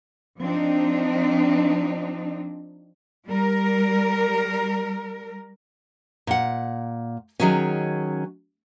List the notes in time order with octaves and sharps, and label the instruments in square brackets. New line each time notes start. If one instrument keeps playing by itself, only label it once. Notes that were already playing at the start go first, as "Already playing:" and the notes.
[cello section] F3 C4 D4 D#4
G3 A#4
[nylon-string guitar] A#2 F#5
D#3 F#3 G#3 C#4